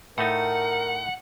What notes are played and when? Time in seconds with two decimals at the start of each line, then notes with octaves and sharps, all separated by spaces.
0.18 A2 A3 D#4 A#4 F#5